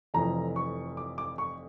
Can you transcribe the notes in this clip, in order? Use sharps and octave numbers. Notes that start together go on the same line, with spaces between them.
F1 F2 E3 A#5
C#6
D6
D6
C#6